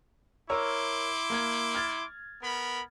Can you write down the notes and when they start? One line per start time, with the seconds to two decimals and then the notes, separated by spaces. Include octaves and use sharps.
0.50 E4 A#4 C#5 C6 D6 E6
1.30 A#3 G#6
1.74 F6 G#6 A6
2.43 B3 A#4 B5